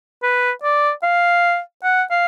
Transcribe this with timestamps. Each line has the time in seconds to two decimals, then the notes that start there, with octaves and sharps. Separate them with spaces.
0.23 B4
0.63 D5
1.03 F5
1.84 F#5
2.11 F5